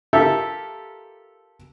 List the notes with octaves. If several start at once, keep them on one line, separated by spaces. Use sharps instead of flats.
F4 G4 A4 A#4 E5